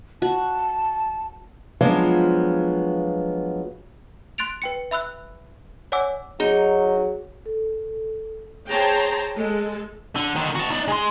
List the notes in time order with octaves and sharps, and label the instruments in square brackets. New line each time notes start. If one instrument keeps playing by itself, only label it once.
[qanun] F#4 [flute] A5
[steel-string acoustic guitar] F3 F#3 G#3 B3 D4 F4
[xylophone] C6 F#6 A6 D7 F7
B4 G5 C#7
E5 B5 E6 F#6
C#5 D5 F#5 G#5 D6 E6
[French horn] F#3 [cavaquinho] D#4 [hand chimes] G#4
[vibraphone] A4
[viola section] G#4 C5 C#5 G5 A5 A#5
G#3 A4
[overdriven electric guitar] D3
D3 D#3
F#4 A5
D#4 D5
G#3 C6